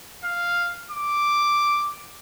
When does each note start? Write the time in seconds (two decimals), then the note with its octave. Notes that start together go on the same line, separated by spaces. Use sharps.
0.24 F5
0.90 D6